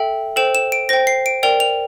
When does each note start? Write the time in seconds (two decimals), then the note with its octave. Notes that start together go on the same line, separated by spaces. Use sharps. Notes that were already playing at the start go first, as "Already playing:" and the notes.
Already playing: A4 E5 G5
0.36 A4 C5 G5 E7
0.55 E7
0.72 D7
0.89 C5 G5 A#6
1.07 C7
1.26 D7
1.43 A#4 D5 G5 F7
1.60 F7